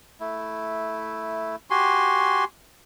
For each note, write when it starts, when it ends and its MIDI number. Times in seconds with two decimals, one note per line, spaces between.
0.20 1.56 57
0.20 1.56 64
1.70 2.44 66
1.70 2.44 67
1.70 2.44 80
1.70 2.44 84